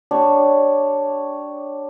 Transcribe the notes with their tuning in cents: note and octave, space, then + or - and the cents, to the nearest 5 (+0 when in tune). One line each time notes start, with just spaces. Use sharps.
D4 +0 G4 -10 C#5 +0